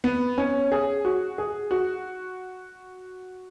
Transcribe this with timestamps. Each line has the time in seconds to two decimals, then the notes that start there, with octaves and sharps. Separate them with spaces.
0.04 B3
0.38 C#4
0.72 G#4
1.05 F#4
1.38 G#4
1.71 F#4